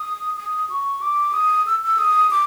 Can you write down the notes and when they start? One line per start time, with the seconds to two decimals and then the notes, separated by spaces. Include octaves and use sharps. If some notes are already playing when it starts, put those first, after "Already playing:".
Already playing: D#6
0.37 D#6
0.70 C#6
1.01 D6
1.33 D#6
1.67 E6
1.84 E6
1.98 D#6
2.31 D6